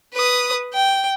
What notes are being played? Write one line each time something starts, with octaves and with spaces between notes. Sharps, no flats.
B4 D#6
G5